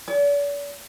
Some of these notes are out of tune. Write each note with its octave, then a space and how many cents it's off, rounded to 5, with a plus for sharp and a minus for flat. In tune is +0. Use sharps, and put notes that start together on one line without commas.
D5 -45